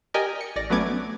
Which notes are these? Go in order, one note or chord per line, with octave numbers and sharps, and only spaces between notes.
G4 A#4 D5 D#5 G5 G#5
C#7
A1 D5 A#6
F#3 A3 B3 C#4 D6 G#6